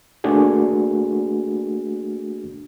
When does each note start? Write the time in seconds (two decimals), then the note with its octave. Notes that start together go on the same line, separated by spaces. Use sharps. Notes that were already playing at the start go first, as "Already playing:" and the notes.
0.24 A3 A#3 D4 F#4 G#4